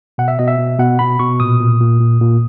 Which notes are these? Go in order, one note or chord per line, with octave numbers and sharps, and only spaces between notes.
B2 F#5
E5
B2 D#5
E5
B2
B2 F#5
B2 B5
B2 C#6
A#2 D#6
A#2
A#2
A#2
A#2